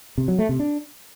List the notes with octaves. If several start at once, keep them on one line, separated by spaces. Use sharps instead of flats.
C3
F#3
A3
C3
D4